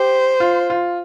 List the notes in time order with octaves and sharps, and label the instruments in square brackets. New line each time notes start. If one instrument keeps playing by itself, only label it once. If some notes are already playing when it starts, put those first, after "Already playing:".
Already playing: [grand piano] G4 [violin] C5
[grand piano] F4
F4